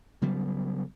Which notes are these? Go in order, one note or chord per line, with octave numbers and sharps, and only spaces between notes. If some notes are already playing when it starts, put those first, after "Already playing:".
C#3 F#3 G3 B3